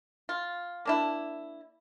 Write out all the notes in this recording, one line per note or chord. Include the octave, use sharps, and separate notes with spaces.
F4
A#3 D4 E4